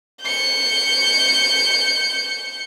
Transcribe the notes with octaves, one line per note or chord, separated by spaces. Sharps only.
G6 C#7